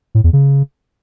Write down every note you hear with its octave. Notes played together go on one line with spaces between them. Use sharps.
A2
E2
C#3